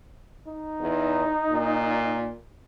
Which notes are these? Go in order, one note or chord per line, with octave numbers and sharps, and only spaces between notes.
D#4
E2
A#2